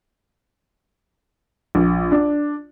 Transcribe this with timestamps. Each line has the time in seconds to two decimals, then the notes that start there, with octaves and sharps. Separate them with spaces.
1.75 A#1
2.12 D4